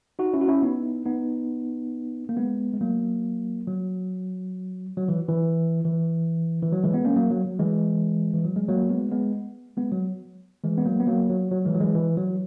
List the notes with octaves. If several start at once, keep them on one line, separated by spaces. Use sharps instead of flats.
D#4 F#4
C#4 E4
F#4
C#4 E4
B3 D#4
B3 D#4
A#3
G#3 B3
G#3
F#3 A#3
F#3
F#3
E3
E3
E3
E3
F#3
E3 G#3
G#3 B3
A#3 C#4
F#3 A#3
F#3
F#3
E3 G#3
E3
F#3
G#3
F#3 A#3
G#3 B3
G#3 B3
G#3 B3
F#3
E3 G#3
B3
F#3 A#3
B3
F#3 A#3
F#3
F#3
E3 G#3
F#3
E3 G#3
E3
F#3